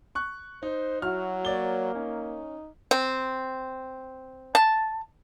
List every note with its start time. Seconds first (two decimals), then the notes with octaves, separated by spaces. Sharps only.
0.15 C#6 F#6
0.63 D#4 C5
1.02 F#3 E4 F#4 F6
1.45 A#3 C#5 D5 G7
1.95 C#4 D#4
2.91 C4
4.55 A5